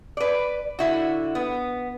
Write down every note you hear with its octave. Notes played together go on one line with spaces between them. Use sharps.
B4 D5
D3 E4 F#4
B3